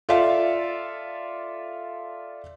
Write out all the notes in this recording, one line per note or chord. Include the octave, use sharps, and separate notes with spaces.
F4 A4 D5 E5 F5